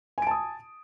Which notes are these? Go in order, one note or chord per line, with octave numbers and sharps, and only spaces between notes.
G#5 A5 D#6 D7